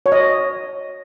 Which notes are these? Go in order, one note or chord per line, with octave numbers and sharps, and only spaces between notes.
C#5
D#5